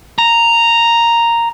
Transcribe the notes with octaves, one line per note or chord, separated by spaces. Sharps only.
A#5